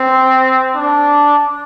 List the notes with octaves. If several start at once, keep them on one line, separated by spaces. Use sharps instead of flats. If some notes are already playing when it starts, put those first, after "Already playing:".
Already playing: C4
D4